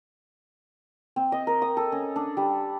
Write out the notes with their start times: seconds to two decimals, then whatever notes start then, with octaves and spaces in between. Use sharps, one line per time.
1.16 C4
1.32 D#5
1.47 A#4
1.62 D#6
1.77 A4
1.92 C#4
2.16 D4
2.37 G3